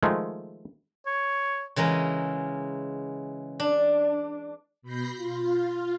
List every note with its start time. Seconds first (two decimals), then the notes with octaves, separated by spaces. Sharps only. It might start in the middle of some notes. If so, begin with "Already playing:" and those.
0.03 D#3 F3 G#3 A3
1.07 C#5
1.76 C#3 E3 G#3 A#4
3.60 D4
4.82 B2 B5 G6 A#6 C7
5.17 F4